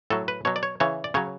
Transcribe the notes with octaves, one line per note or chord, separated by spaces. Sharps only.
A2 F#3 A4
B4
B2 F#3 C#5
D5
C#5
C#3 E3 C#5
D5
C#3 F#3 C#5